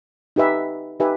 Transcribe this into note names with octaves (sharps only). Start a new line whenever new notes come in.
D#4 G4 B4 E5 G#5
D#4 G4 B4 E5 G#5